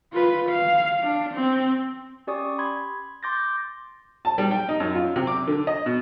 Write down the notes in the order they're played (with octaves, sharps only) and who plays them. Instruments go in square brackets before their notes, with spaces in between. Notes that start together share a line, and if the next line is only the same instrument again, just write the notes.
[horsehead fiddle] F4 B4
F5
D4
C4
[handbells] C#4 G4 D5 C#6 D#6
B5 C6 G#6
C6 D6 G6 A6 A#6
[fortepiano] A5
G3
G5
D#4
F#2
F4
C3
D6
D3
D#5
B2